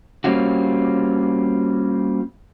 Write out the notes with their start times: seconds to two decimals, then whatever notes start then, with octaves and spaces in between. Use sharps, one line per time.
0.24 G3 A#3 C4 C#4 F4 F#4